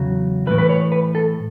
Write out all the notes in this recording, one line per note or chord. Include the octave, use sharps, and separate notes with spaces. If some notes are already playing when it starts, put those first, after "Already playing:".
Already playing: E2 C#3 F#3
A2 E3 B4
B4
C#5
B4
A4